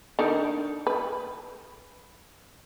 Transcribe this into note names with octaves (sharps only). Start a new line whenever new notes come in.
D3 D#4 A#4
B4